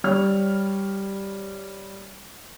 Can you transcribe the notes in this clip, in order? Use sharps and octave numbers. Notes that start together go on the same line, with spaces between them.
G3 C#5 F6